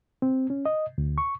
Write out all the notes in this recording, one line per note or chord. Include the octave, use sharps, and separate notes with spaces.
C4
C#4
D#5
D2
C#6